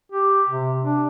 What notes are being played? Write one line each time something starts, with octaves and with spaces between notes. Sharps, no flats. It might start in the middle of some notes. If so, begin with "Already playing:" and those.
G4
C3
D4